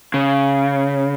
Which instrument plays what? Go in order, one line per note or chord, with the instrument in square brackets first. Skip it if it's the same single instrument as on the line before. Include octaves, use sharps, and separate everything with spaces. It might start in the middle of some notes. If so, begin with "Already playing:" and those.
[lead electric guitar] C#3